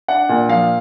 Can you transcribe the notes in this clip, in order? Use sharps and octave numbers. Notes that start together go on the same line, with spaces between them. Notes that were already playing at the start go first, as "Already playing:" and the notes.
D4 F#5
A#2
F3 F5